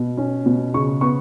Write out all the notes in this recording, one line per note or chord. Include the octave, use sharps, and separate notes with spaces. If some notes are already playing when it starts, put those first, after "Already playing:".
Already playing: B2
C#4
B2
C#3 C#6
B3 C#6